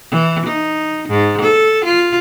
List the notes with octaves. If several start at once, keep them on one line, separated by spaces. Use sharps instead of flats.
E3
D#4
G#2
A4
F4